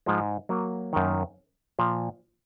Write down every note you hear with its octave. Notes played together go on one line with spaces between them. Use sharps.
G#2 F3 G#3
F#3 A#3
F#2 D#3
A#2 F3